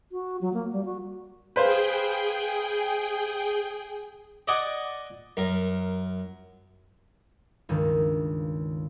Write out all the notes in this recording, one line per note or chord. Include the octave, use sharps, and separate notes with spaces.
F#4
F#3
A#3
G3
F#4
G#4 B4 C5 F5 G5
D5 D#5 F#5 G#5 D6 D#6
F#2 A#4
C#2 G2 D#3